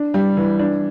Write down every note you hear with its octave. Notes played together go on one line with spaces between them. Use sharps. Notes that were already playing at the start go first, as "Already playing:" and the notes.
Already playing: D4
G3
E3
D4